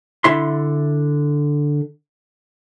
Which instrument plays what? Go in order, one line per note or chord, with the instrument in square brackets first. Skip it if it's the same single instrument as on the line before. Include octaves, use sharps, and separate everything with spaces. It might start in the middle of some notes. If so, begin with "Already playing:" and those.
[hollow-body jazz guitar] D3 E4 E5 C6